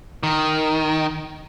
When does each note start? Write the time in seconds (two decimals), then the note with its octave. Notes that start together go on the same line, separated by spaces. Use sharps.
0.23 D#3